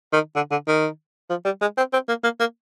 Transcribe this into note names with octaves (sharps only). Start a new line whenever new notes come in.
D#3
D3
D3
D#3
F3
G3
G#3
C4
C4
A#3
A#3
A#3